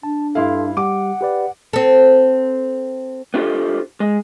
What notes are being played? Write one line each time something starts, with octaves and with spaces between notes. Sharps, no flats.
D4 A5
G2 E4 A4 F5 C6
G3 G4 F#5 D6
G4 B4 D5
C4 A4
B3 D4 F4 G4 A4 C5
G#3